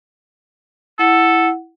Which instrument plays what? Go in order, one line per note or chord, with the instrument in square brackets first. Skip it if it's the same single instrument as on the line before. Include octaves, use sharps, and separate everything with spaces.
[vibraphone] E4 F#5 [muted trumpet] A4